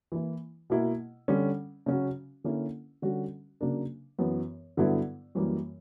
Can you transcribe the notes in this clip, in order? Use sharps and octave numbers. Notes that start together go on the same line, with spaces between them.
E3 A#3 E4
B2 A#3 E4
D3 G3 C#4
C#3 F#3 C#4 F#4
D3 A#3 C#4 E4
D3 G3 C#4 F#4
C#3 F#3 A#3 D4
F#2 E3 B3
G2 D3 F#3 B3 E4
F#2 E3 G3 A#3